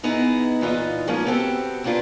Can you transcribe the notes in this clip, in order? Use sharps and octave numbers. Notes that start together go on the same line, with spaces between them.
B2 B3 D#4 E4 G#4 D#5
A#2 E3 B3 D#4 F4
F3 G#3 A#3 B3 C#4 D#4
B3 C4 F#4 G4 A4
A#3 C#4 D4 F4 B4